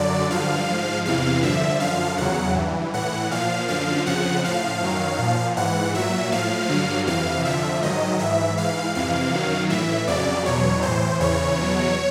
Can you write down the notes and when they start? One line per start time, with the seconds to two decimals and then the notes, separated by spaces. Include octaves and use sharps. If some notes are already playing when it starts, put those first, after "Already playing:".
Already playing: F#2 D3 F#3 D5
0.30 G2 D3 F3 F5
0.68 G#2 F3
1.05 E2 C3 E3 F5
1.42 G2 D3 F3 E5
1.80 F#2 D3 F3 F5
2.18 E2 C#3 F#3 F#5
2.56 G2 E3
2.94 A2 E3 F#5
3.31 A#2 F3 F5
3.68 F#2 D3 F3 F5
4.06 F2 C#3 F3 F#5
4.43 A2 F3 F5
4.81 F#2 D#3 F#3
5.18 A#2 F3
5.57 G#2 E3 F#5
5.94 A#2 F#3 E5
6.32 A2 F3 F5
6.69 G2 D3 F#3
7.07 F2 C3 E3 F5
7.45 F2 D3 F3 E5
7.82 G#2 D#3 F#3 D#5
8.19 G#2 E3 E5
8.57 G#2 E3 F5
8.95 F2 C3 E3 F5
9.32 F#2 D#3 F#3
9.70 A2 E3 E5
10.07 F2 C#3 F#3 D5
10.45 E2 B2 F#3 C#5
10.82 A2 E3 C5
11.20 E2 C#3 E3 C#5
11.57 E2 B2 F#3